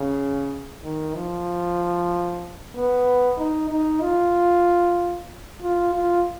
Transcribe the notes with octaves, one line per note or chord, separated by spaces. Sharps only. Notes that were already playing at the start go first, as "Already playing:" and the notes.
Already playing: C#3
D#3
F3
B3
D#4
D#4
F4
F4
F4